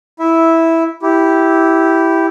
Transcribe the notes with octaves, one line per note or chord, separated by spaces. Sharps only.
E4 E5
E4 G4